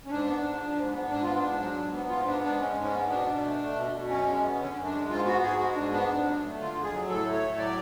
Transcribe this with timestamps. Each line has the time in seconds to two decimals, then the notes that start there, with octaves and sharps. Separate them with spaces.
0.06 C#4
0.10 G#2 D4
0.26 B3
0.43 G#2
0.60 F3
0.76 G#2
0.93 B3
1.09 G#2 D4
1.22 B3 F4
1.36 D4
1.44 G#2
1.60 F#3
1.77 G#2
1.92 B3
2.09 G#2 F4
2.26 B3 D4
2.43 G#2 D4
2.60 G#3 C#4
2.76 G#2
2.84 C#4
2.93 B3
3.09 B2 D4
3.26 B2
3.43 A3
3.60 A3
3.76 B2
3.92 B2
4.09 F#2 C#4
4.26 G#3
4.42 B3
4.59 D3 C#4
4.75 F#2
4.84 D4
4.92 G#3
5.08 G#2 F4
5.25 B3 F#4
5.42 G#2 G#4
5.59 G#3 F#4
5.75 G#2 D4
5.92 B3 D4
6.09 F2
6.25 F#3
6.42 A3
6.59 D3 F4
6.76 F2
6.84 G#4
6.92 F#3
7.09 A2 A4
7.26 A3
7.33 C#5
7.42 A2
7.58 F#3 D5